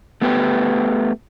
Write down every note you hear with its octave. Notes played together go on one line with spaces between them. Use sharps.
A3 B3 G4 B4 G5